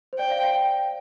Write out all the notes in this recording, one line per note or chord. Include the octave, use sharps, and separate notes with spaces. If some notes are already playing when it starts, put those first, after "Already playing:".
C5
D5 G5
F5
F5
G5